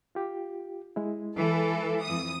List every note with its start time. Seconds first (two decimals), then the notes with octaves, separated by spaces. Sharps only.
0.15 F4 G4
0.96 G#3 E4
1.38 E3 A4
2.02 F2 D#6